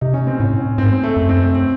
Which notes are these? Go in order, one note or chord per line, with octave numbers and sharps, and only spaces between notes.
C3 D#4
C#4
C4
A2 C#4
G#2 C4
C4
A3
F#2
C4
C4